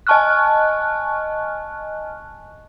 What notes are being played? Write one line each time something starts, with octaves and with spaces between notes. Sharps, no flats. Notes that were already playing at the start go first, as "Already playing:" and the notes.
D#5 G#5 A5 C#6 F6 F#6